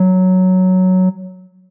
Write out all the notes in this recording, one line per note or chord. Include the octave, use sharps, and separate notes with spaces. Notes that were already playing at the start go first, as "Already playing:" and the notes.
Already playing: F#3